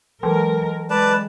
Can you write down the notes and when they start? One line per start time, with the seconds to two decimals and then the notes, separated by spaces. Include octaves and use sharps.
0.23 E3 F#3 G#3 A#4
0.90 G#3 B4 D5 A5